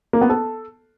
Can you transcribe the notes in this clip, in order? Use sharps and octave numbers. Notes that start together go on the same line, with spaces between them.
A#3
B3
A4